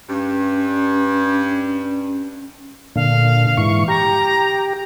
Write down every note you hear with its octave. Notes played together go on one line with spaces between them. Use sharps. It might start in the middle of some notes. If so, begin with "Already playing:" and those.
G2 C#4
A#2 D3 F5
G#2 E3 C#6
G4 A#5